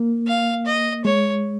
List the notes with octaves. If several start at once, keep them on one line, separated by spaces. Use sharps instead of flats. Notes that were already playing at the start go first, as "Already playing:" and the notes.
Already playing: A#3
F5
D#5
G#3 C#5